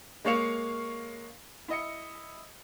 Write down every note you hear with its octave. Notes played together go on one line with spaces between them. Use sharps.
G#3 A#3 C#5 F5 C#7 F7
E4 D#5 C#7